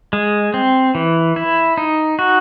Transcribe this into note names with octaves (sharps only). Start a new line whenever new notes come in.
G#3
C4
E3
E4
D#4
F#4